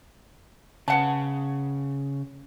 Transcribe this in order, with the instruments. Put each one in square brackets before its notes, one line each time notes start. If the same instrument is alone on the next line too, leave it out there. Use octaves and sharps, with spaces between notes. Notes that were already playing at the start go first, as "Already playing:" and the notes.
[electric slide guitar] C#3 [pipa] B3 F#5 A5